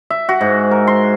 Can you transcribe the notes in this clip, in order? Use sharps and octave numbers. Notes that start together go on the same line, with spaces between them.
E5
F#4
G#2
A#4
C6